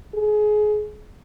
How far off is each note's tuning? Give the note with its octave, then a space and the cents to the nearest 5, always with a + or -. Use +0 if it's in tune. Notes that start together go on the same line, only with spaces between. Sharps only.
G#4 +25